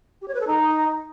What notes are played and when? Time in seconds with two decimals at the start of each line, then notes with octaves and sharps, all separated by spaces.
0.22 G4
0.28 C#5
0.34 B4
0.41 A4
0.47 D#4